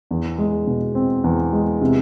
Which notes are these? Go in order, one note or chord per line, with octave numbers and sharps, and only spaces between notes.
E2
G#3
B2
C4
E2
G#3
C3